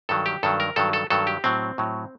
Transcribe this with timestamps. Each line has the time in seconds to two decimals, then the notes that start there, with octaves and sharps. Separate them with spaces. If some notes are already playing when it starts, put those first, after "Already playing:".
0.09 G2 D#3 F#3 A4
0.26 G4
0.43 G2 D#3 F#3 A4
0.60 A#4
0.76 G2 D#3 F#3 A4
0.93 A4
1.10 G2 D#3 F#3 A4
1.27 G4
1.44 A2 F#3 C4
1.78 A2 F#3